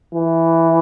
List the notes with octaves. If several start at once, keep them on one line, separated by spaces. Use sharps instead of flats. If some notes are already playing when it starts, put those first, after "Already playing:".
E3